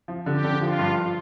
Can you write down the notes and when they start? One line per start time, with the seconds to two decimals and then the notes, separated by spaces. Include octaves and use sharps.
0.08 F3
0.26 D3 G4
0.44 D3
0.61 F3 F4
0.79 G2